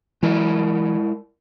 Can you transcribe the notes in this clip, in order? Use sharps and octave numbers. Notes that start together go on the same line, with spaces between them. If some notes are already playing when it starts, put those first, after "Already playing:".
E3 F#3 G#3 E4 A#4